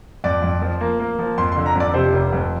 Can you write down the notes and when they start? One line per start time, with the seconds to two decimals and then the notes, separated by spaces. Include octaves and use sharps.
0.24 F2 D5
0.42 F2
0.62 F3
0.81 A#3
1.00 A#3
1.19 F3
1.38 F2 C6
1.52 C6
1.56 D3
1.66 A#5
1.76 F2 D5
1.94 C3 C5
2.13 F1
2.33 F2